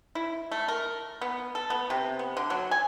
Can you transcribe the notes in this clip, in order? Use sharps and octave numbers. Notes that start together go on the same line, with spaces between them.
E4
A3
A#4
B3
A4
B3
C3
B3
D3
F#3
G#5